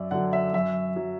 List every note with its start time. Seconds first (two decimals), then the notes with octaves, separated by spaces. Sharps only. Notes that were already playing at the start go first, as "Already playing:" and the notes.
Already playing: F#2 D5 E5
0.11 D3 F#3 F#5
0.33 E5
0.53 F#2 E5
0.96 F#3